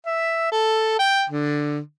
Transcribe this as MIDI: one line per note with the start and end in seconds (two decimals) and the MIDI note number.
0.06 0.51 76
0.52 0.97 69
0.99 1.24 79
1.30 1.78 50